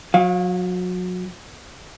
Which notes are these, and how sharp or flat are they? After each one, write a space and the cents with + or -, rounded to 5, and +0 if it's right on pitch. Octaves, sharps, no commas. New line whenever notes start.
F#3 -30 F5 +20